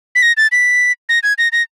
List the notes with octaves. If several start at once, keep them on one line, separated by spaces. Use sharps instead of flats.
B6
A#6
A6
B6
A#6
G#6
A#6
A#6